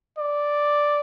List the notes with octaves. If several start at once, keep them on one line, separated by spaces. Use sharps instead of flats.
D5